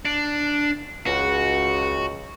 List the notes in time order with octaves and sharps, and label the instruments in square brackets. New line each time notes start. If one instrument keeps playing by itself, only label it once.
[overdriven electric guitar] D4
[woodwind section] C#2 [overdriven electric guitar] F#4